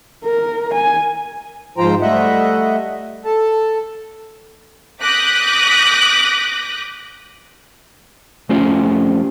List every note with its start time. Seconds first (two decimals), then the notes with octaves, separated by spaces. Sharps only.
0.24 A#4
0.73 G#5
1.78 G#2 F3 F4 C5 G5 A#5
2.01 G3 A3 D#5 E5 F#5
3.25 A4 A5
5.02 D6 D#6 F#6 G6 A#6 B6
8.49 F2 A3 C#4 F4 G4 C5